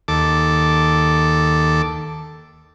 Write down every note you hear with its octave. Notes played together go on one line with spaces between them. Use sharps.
D#2 A4 D6